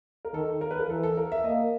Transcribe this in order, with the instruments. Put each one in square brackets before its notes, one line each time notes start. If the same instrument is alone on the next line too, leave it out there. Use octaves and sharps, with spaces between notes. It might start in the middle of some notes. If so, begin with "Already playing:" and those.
[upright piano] A#4
[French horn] D#3 [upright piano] A4
[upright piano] A#4
B4
A#4
[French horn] E3 [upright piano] A4
[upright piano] A4
A#4
E5
[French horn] A#3 [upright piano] D#5